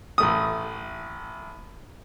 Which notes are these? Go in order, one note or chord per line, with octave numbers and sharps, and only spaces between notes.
A1 A3 D#6